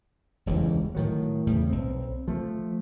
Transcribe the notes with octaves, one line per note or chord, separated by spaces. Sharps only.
E1 C#2 E3 G3
A2 D#3 F#3
E2 A2 C#3 G3
B1 C4
F3 A3